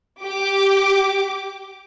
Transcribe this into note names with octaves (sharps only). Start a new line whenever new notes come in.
G4 D6